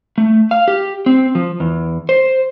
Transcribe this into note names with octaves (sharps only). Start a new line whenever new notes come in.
A3
F5
G4
C4
F3
E2
C5